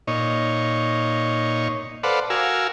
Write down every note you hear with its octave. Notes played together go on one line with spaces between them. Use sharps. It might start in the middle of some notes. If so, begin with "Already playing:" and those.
A#2 D#4 C#5
A4 B4 C5 D5 F5 F#5
F#4 A#4 F5 G#5 E6